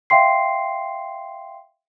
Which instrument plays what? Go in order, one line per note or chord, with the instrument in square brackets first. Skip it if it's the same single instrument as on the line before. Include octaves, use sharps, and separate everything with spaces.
[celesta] E5 F5 G5 C6 C7